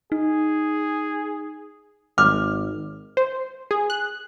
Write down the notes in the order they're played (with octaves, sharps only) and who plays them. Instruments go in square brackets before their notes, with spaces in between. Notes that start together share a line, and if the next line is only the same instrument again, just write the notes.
[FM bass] D#4 [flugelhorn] G#4
[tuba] G#1 [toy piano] D6 [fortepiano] F6
[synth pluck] C5
G#4
F#6